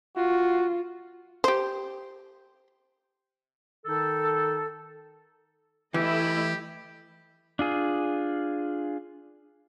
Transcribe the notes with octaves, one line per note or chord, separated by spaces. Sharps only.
F4 F#4
G4 C5
D#3 D#4 A4
E3 A3 E4 G4 D#5
D4 F4 G#4